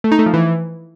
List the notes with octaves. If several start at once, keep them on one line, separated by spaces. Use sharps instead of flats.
A3
D#4
A3
F3
E3